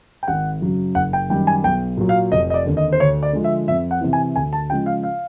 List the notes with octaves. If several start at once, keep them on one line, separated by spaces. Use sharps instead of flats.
G5
G#1 F#5
F#2 C#3 F#3
F#1 F#5
G5
F#2 D#3 G3 G5
G#5
B1 G5
A#2 F#3
F5
F1 D#5
D#5
D5
D#2 D3
D#5
C5
D2 C#5
D5
D3 F3 G#3
E5
F2 E5
F#5
C3 E3
G#5
D2 G#5
A5
C#3 F3 G#3 G5
F5
F5